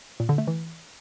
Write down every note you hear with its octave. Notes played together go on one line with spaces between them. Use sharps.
A#2
D3
A3
E3